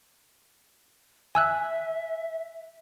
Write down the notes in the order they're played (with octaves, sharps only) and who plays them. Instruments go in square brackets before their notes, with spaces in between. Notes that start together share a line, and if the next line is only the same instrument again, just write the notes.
[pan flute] E5 [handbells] G#5 E6 F#6